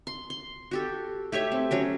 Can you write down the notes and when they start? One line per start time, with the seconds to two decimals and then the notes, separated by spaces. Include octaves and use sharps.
0.07 C6
0.30 C6
0.71 F#4 G4 A4
1.32 A3 G4 C#5 E5
1.52 C4
1.71 F#3 C#4 G4